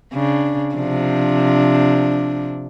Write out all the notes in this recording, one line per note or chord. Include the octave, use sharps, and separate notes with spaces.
C#3 D4
C3 F3 D4